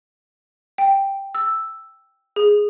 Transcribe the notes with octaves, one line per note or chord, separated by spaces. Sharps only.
G5
E6
G#4